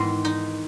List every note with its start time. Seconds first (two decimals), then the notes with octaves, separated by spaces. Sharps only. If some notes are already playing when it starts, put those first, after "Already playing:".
Already playing: G#2 D#3 E3 B3
0.25 D#4